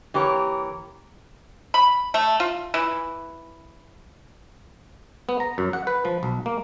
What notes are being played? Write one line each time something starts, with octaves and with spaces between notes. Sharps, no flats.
E3 A#3 G4 A#4 C#5
B5
A3
F4
E3
B3
A#5
F#2
F#5
B4
F3
B1
A#3